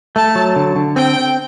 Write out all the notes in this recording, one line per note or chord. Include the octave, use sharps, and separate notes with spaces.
A3 A5
F#3
D3
D3
C4 G5
C4